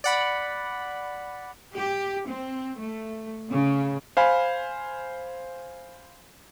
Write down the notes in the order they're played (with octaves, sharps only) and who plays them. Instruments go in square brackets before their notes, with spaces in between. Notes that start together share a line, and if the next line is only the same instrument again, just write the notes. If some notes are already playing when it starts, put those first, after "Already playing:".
[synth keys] D5 F#5 B5
[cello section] G4
C4
A3
C#3
[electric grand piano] C5 F5 G#5 B5